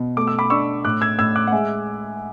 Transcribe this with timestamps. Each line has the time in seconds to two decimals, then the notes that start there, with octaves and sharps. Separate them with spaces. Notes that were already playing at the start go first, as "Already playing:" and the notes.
Already playing: B2
0.17 A3 D6
0.27 E6
0.39 B5 D6
0.50 D4 C#6 E6
0.85 A2 D6 F#6
1.01 E6 G#6
1.19 A2 E6 G#6
1.36 D6 F#6
1.47 F#5
1.52 G#3 E5 G#5